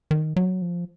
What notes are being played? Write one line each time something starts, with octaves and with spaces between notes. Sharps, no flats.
D#3
F#3
F3